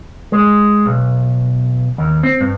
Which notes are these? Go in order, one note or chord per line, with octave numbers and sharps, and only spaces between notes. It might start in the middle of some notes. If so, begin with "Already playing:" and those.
G#3
B1
D#2
C4
G2